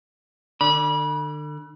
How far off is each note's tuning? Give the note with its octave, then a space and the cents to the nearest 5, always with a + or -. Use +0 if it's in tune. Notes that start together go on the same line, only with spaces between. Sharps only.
D3 +35 D5 +0 B5 -30